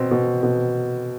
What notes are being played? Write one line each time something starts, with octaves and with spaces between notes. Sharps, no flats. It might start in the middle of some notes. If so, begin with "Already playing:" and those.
Already playing: B2 C4
B2
B2